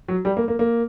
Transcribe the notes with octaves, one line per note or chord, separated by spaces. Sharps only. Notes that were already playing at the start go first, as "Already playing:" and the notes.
F#3
G3
A#3
A#3
A#3